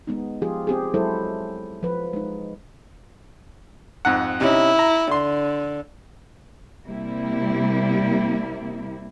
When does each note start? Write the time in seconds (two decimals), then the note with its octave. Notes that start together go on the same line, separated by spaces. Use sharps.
0.07 G#3 B3 D#4
0.42 F3 F4 G4 G#4
0.67 C4 G4 G#4
0.94 F#3 G#3 E4 A4 C5
1.83 F3 B4
2.13 G#3 D#4
4.05 F2 G#2 F#5
4.41 C3 C#4 D#4 E4
4.79 A#5
5.11 D3 C6
6.86 C3 G3 A#3 E4